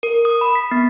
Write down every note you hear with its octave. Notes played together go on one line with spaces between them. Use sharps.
A#4
D#6
B5
B6
B3